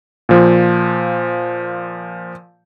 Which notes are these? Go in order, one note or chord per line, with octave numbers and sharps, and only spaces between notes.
A#2 F3